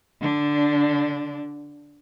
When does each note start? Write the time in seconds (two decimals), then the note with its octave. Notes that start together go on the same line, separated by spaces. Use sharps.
0.21 D3 D4